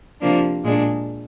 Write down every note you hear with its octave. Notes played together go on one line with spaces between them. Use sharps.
C3 F3 A#3 D4
A#2 G#3 D4